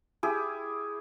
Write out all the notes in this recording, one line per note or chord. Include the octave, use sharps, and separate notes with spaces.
E4 G4 G#4